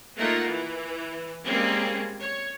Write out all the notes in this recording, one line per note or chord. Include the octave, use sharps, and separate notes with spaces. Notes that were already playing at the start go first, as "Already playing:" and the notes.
A3 A#3 D#4 F4 A#4 F#5
E3
G3 G#3 A#3 C4 C#4
C#5